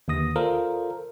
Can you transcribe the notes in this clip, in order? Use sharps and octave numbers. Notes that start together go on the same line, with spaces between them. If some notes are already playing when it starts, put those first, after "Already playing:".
D#2 D3 D#6 A#6
F4 A4 A#4 C5 D5 F5